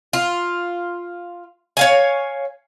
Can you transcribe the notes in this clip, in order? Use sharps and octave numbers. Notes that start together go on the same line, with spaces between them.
F4
C#5 F5 G#5